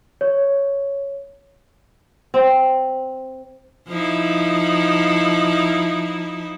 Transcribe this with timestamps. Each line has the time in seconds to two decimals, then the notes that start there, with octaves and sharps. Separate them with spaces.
0.21 C#5
2.34 C4
3.88 F3 D#4 E4